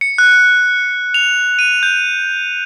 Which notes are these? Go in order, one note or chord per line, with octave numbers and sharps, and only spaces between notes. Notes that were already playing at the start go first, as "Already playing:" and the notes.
C#7
F#6
F7
D#7
G6